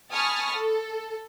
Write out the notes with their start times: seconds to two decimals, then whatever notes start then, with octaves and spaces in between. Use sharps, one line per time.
0.11 G#5 A5 B5 C#6 D#6 F6
0.52 A4